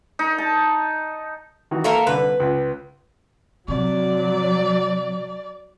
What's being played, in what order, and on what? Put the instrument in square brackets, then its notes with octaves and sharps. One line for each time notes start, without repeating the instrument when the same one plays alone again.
[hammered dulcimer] D#4
A5
[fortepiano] D#3 E3 F#4
[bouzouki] A#3 A4 A#4 [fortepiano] E5 F5 C#6
[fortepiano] C2 D3 [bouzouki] B4
[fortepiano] C#2
[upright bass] C3 [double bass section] F#3 [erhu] D5